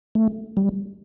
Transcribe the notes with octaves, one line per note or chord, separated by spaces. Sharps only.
A3
G3